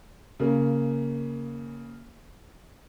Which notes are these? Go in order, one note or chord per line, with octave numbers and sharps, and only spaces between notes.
C#3 A#3